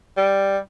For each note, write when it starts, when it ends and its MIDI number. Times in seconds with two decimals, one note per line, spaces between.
0.17 0.58 55